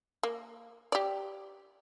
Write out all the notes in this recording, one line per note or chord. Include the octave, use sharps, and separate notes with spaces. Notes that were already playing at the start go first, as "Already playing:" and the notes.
A#3
G4 D5